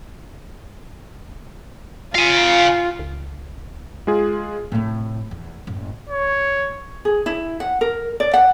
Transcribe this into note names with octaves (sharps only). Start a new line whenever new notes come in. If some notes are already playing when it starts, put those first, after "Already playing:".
F4 F5 G#5
C#2
G#3 F4 G#4
A2 C3
E2
F#1 A2
C#5
G#4
E4
F#5
A#4
D5
F#5